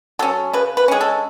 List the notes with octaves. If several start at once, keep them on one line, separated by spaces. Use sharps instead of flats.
F#3 C#4 A4
C#3 B4
B4
G#3 C#4 G#4
A4